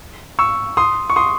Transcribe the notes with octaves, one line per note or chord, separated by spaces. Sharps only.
C#6 E6
C6 D#6
C#6
C6 D#6